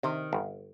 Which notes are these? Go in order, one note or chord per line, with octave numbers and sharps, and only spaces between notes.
C3 D#3
G1